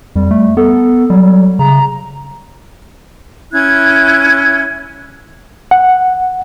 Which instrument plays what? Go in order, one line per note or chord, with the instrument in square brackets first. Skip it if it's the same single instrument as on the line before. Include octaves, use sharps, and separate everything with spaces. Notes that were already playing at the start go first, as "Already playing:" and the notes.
[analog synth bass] F2 [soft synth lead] G3
[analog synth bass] A3
[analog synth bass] B3 [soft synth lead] A4
[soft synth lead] F#3 [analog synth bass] G3
[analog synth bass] C#3 [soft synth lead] A#5
[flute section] C#4 E4 F#6 G#6
[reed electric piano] F#5